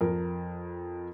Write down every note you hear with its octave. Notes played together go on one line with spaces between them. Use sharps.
F2 A#4